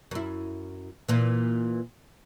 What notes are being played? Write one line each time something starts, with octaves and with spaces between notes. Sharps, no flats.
F#2 E4
A#2 E3